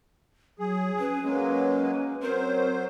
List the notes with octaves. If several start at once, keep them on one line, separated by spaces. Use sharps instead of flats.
F#3 G#4
C#4 B4
F#3 G#3 A#3 C#4
F#3 C4 A#4 C5